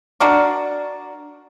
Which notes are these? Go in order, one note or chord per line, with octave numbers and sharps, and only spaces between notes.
D4 F#4 A#4 D5